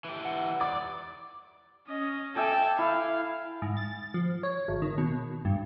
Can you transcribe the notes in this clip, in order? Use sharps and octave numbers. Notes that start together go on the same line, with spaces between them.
E3 G4
F#5
D5 D6
C#4 D#5
A4 E5 G5 G#5 D6
E4 F5
G#2
A6
F3
C#5
G#1
D#3
B2
G2